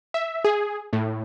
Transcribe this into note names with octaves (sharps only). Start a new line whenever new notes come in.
E5
G#4
A2